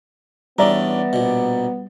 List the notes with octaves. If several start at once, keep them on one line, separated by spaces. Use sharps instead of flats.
E2 G3 B3 C#4 D4 D5 E5 A#5
A#1 B2